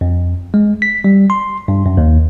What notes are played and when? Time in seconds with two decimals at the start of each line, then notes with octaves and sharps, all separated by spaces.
0.01 F2
0.54 G#3
0.82 B6
1.04 G3
1.30 C6
1.68 G2
1.86 F#2
1.97 D#2